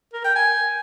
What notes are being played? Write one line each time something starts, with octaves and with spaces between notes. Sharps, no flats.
A#4
G5
G#5